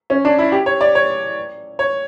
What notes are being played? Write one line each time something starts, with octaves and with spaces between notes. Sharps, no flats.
C#4
D4
E4
G4
C#5
D5
C#5
C#5